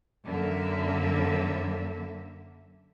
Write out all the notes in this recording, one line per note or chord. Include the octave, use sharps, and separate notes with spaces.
F#2 D3 A#3 E5